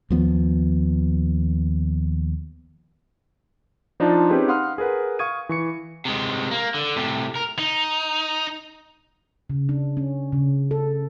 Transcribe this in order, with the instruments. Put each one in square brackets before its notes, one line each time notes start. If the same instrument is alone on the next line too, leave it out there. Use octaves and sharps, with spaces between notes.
[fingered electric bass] D#2 F3 B3
[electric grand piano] F3 D4 D#4 F4 D5 A5
C4 C#4 D#4 G4 G#4 B4
F5 F#5 B5 C6 D#6 F6
G#4 A#4 B4 F#5
F5 C#6 D#6 G#6 D#7
E3 C#6 C#7
[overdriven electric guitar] C3 G#3
A#3
D3
A2 C3
A#4
[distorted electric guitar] D#4
[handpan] C#3
D4
C#4
C#3
A4